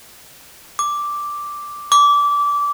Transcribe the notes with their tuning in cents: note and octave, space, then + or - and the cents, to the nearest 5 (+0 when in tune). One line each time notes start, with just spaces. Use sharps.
D6 +0
D6 -20